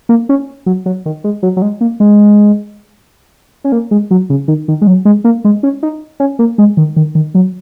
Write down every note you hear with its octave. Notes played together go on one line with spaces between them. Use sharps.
A#3
C#4
F#3
F#3
D#3
G#3
F#3
F#3
G#3
A#3
G#3
C#4
A#3
G#3
F#3
C#3
D#3
D#3
G#3
F#3
G#3
A#3
G#3
C#4
D#4
C#4
A#3
G#3
D#3
D#3
D#3
F#3